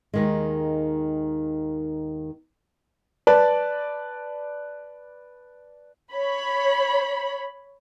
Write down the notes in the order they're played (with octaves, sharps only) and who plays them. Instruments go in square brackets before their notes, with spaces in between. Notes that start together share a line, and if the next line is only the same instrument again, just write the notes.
[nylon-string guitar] D#2 D#3 G#3
[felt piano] B4 D5 A5
[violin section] C#5 B5